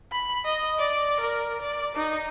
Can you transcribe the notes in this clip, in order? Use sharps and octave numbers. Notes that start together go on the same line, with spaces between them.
B5
D#5
D5
A#4
D5
D#4